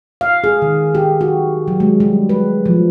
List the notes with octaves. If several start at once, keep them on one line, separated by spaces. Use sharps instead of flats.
F5
G#4
D#3
G4
F#4
F#3
G#3
G3
B4
F3